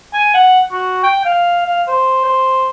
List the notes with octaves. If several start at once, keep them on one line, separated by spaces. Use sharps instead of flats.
G#5
F#5
F#4
G5
F5
F5
C5
C5